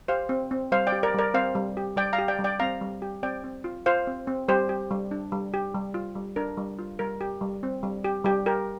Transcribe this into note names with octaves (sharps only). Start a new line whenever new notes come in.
G4 C5 F5
C4
C4
G3 C5 F5
D5 G5
G4
A#4 D5
G3 A#4 D5
C4 C5 F5
G3
G4
G3 D5 G5
F5 A#5
G4
D5 G5
G3
D5 G5
C4 F5 A#5
G3
G4
C4 D5 G5
C4
F4
F4 C5 F5
C4
C4
G3 G4 C5
G4
G3
D4
G3
G4
G3
F4
G3
D4 A#4
G3
F4
G3 A#4
G4
G3
C4
G3
G4
G3 G4
G4 A#4